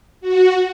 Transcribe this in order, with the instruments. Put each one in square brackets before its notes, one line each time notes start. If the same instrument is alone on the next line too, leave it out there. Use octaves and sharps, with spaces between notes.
[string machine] F#4